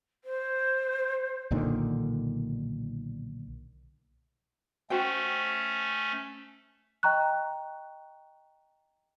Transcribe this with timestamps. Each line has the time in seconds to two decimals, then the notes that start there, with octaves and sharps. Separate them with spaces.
0.24 C5
1.51 B1 A#2 D3 D#3
4.90 A3 C#4 F#4 C5 G5
7.03 D#5 G5 A#5 C#6 F#6